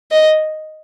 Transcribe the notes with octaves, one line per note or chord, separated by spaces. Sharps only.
D#5